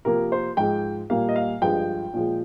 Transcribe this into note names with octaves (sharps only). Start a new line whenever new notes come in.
C3 F3 A#3 A#4
C5
G#2 F3 G#3 G5
A#2 G3 A#3 F5
D#5
F5
G2 F3 G#3 G5
A#2 F3 G#3